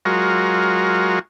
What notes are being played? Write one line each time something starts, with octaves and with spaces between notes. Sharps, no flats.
F#3 G#3 F4 F#4 A#4